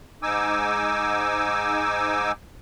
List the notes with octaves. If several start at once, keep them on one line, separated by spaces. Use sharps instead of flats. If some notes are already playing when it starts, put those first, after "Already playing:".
G#2 D#4 G#5 D6 E6